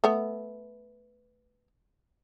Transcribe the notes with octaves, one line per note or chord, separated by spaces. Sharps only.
A3 B3